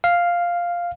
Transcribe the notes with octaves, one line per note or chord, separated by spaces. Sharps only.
F5